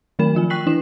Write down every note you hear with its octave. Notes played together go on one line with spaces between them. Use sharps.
D#3 F#3 A3 A#4 B5 E7
F3 F4 G#5
G5 C#6 F#6 B6 C7 F#7
E3 D4 E4 E7